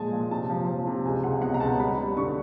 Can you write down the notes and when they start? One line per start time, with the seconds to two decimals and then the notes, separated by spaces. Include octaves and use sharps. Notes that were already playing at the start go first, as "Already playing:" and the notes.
Already playing: A#2 F3 G#3 G#5 A5
0.12 A#2
0.31 C3 A5
0.50 F3
0.68 F3
0.87 C3
1.05 C#2 G#5
1.23 C#2 F#5
1.42 B2 F#5
1.54 A#5
1.60 C#2 A5
1.79 G3 B5
1.97 G3
2.17 D3 C#6